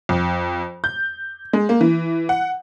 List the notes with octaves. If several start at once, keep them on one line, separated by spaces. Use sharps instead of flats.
F2
G6
G#3
A#3
E3
F#5